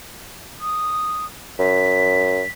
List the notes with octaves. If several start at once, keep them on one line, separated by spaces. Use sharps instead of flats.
D#6
F#2 B6